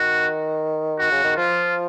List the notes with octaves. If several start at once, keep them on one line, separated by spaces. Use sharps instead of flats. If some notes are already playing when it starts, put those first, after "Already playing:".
Already playing: D#3 F#4
F#4
C#3
D#3
F3 F4